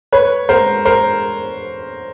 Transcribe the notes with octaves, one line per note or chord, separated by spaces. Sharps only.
B4 C#5
A#4 C5
A#4 C5